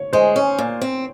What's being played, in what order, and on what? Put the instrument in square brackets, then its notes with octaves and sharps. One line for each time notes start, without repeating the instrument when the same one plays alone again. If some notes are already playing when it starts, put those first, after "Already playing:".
Already playing: [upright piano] C#5
[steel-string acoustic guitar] G#3 [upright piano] C5
[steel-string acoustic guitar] C#4
A#2
C4